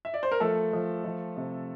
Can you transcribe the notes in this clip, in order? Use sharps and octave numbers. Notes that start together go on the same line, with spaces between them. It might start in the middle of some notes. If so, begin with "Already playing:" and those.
E5
D5
C5
A#4
F3 A3 A4
F3
F3
C3